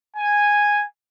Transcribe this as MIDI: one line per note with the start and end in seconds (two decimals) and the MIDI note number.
0.17 0.85 80